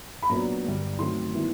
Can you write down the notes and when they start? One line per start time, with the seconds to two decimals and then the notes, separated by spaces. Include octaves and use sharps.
0.23 B5
0.29 A#2 F#3 B3 D4 A#5
0.64 G2 D3 G3
0.99 D#3 F#3 A3 C4 C6
1.33 D#3 G3 B3 E4